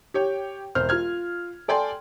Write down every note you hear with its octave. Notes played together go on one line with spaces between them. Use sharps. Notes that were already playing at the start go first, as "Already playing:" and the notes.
G4 C#5 G5
E1 C5 F6
F4 F6 G#6
A4 D5 G5 G#5 C6